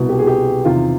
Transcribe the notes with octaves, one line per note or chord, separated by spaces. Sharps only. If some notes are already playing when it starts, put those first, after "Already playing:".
Already playing: C2 B2
G4
G#4
G4
E2 C3 D#3 F4